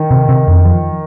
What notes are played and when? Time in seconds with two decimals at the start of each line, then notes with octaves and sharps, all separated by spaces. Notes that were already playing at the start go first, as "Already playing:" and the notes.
Already playing: D#3
0.11 C3
0.29 C3
0.48 F2
0.65 F3